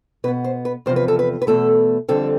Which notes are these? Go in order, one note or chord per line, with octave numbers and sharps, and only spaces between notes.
B2 B3 B4
C5
B4
E2 C3 F3 C5
B4
A4
B4
B4
E2 B2 A3 A4
F2 D3 G3 C4 A4